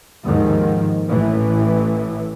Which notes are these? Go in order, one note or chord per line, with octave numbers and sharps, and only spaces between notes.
D#2 G#2 D#3 F3
A1 A2 E3